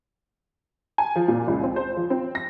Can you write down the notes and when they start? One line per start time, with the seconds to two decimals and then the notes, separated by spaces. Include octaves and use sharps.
0.98 G#5
1.16 F3
1.28 A#2
1.47 C#2
1.63 C4
1.76 C5
1.97 F3
2.10 C4
2.35 A#6